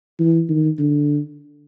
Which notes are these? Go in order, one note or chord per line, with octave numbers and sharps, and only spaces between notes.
E3
D#3
D3